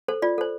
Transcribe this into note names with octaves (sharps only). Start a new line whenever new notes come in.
A4 C5
F4 D5
A4 C5